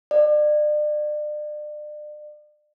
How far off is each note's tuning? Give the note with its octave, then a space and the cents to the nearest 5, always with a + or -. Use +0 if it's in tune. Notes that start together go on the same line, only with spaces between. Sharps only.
D5 +35